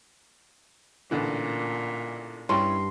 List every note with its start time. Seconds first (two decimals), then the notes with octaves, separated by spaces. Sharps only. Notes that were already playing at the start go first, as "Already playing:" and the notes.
1.11 A1 A#2 D3 E3
2.49 G2 C#4 E4 C#5 C6